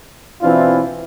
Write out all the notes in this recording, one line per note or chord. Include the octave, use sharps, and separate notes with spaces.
B2 E3 C4 D4 E4 F4